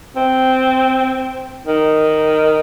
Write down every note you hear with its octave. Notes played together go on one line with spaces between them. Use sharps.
C4
D#3